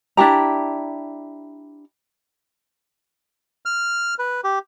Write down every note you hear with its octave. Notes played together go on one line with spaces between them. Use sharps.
D4 E4 G4 A#5
F6
B4
G4